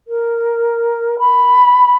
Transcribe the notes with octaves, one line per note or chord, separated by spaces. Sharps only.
A#4
B5